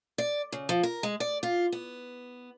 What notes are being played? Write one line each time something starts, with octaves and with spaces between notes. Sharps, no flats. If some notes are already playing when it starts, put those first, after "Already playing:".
D5
C#3
F3
A#4
G#3
D5
F4
B3